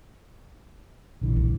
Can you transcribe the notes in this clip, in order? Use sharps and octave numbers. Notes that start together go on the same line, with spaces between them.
A#1 D3 E3
D2 G2